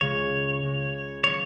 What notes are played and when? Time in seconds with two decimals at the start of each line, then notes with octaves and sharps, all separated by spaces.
0.01 C#2 C#3 G#3 C#5
0.62 C#2 C#3 G#3
1.24 D#3 F#3 A#3 F#4 C#5